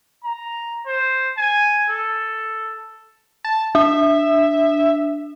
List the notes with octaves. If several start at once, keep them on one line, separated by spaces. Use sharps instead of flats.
A#5
C5
G#5
A4
A5
D4 E5